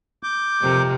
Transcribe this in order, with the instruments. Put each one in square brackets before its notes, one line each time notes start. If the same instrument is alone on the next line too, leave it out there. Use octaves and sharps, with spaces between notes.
[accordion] D6 G6
[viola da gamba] F2 C3 A#4